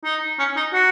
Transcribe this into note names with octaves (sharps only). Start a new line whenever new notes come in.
D#4
C#4
D#4
F#4